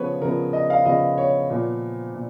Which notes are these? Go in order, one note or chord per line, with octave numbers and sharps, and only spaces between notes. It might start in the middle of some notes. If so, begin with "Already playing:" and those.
Already playing: C#3 F3 B3 B4 C#5
C#3 F3 B3 A#4
D#5
F5
C#3 F3 B3 D#5
C#5
A#2 F3 B3
A#2